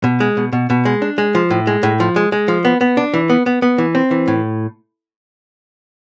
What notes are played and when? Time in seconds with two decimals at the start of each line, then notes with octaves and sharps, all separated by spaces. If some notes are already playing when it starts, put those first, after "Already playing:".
0.04 B2
0.20 G#3
0.37 B2
0.53 B2
0.70 B2
0.85 G#3
1.02 D4
1.18 G#3
1.35 F3
1.50 A2
1.67 G#3
1.83 A2
2.00 F3
2.16 G#3
2.32 G#3
2.48 F3
2.65 B3
2.81 B3
2.97 D4
3.14 E3
3.30 B3
3.46 B3
3.62 B3
3.78 E3
3.95 C4
4.11 E3
4.28 A2